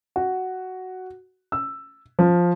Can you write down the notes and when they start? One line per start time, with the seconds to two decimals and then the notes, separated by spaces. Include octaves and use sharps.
0.16 F#4
1.52 E6
2.19 F3